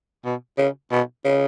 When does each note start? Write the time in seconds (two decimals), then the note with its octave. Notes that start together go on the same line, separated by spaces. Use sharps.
0.25 B2
0.58 C#3
0.91 B2
1.24 C#3